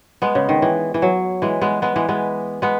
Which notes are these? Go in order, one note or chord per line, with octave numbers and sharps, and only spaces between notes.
G#3 B3
C#3
D#3
E3
E3
F#3
E3 G#3
G#3 B3
G#3 B3
E3 G#3
G#3 B3
G#3 B3